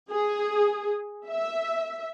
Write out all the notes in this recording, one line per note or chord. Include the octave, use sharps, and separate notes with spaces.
G#4
E5